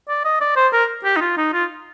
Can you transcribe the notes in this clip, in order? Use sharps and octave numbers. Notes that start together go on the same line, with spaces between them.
D5
D#5
D5
C5
A#4
G4
D#4
F4
D#4
F4